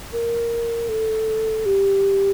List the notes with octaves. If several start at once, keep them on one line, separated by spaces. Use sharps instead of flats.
A#4
A4
G4